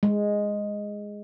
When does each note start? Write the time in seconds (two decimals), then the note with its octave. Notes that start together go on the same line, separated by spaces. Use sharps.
0.03 G#3